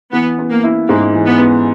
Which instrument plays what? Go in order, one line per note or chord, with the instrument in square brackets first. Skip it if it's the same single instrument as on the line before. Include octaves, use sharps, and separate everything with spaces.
[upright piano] E3 [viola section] B3
[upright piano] B3
[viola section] A#3
[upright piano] E4
[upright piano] G#2 [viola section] A#3
[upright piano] E3
[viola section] B3
[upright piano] B3